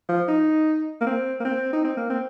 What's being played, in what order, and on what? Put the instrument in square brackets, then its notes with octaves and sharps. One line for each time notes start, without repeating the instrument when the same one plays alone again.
[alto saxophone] F3
D#4
A#3
C4
A#3
C4
D#4
C4
A#3
C4